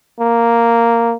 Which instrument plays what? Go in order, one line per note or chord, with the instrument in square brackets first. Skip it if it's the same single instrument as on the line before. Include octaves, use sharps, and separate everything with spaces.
[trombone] A#3